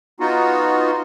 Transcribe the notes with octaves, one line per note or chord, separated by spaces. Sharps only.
B3 D#4 F4 F#4